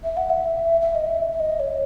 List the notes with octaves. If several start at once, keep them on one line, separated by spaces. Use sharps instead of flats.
E5
F#5
E5
E5
D#5
E5
E5
D#5
C#5